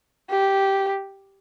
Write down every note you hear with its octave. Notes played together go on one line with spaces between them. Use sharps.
G4